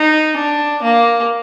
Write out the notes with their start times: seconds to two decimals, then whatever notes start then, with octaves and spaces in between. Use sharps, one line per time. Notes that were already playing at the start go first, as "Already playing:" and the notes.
Already playing: D#4
0.37 D4
0.82 A#3